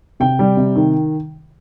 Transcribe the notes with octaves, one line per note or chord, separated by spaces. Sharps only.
C3 G5
G3
C3
D#3